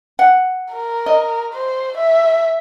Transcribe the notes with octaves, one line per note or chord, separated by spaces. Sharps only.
F#5
A#4
D#5
C5
E5